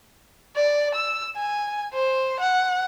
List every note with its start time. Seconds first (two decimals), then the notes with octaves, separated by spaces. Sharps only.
0.56 D5
0.95 E6
1.36 G#5
1.94 C5
2.40 F#5